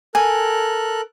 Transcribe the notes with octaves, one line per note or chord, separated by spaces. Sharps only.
A4 A#4 G#5 F#6